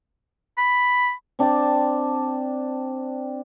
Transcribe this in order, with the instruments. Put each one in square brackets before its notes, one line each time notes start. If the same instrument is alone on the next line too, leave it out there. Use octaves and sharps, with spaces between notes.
[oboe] B5
[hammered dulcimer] C4 D4 G5 A5